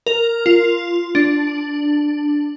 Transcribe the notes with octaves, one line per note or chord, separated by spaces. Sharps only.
A#4
F4
D4